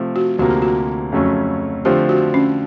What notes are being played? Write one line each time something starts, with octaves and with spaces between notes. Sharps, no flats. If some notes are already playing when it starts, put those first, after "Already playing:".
Already playing: C3 F3 A3
F#4
D2 C3 F3 A#3 F#4
G4
F#4
F2 C#3 F#3 A3 C#4
D3 F3 A3 C4 G4
F#4
C#4